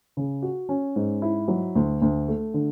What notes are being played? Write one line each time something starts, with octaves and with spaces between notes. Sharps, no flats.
C#3
F#4
C#4
G#2
E4
F#3
D2
D2
A3
D3